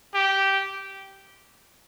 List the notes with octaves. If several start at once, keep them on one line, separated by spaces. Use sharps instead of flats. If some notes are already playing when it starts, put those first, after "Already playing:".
G4